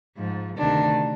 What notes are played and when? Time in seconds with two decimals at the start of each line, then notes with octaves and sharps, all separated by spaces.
0.16 G#2 F3
0.57 D2 C3 D#3 D4